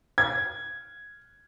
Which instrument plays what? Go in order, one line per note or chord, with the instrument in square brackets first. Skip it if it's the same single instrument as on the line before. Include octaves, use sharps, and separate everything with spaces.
[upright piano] G#6